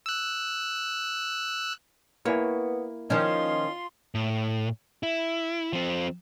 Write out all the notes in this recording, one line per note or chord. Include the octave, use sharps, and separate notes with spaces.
E6 F#6
A#3 B3 E4 C#5 G#5
D#3 F3 C#4 D#4 F4 C6
A2
E4
F3 C4